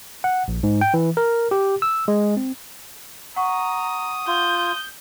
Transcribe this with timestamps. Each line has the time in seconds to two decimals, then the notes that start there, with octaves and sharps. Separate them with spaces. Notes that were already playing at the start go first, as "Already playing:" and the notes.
0.24 F#5
0.48 A#1
0.63 G#2
0.81 G5
0.94 E3
1.17 A#4
1.51 G4
1.82 E6
2.08 G#3
2.37 C4
3.36 F#5 A#5 C#6 D#6
4.27 F4 G6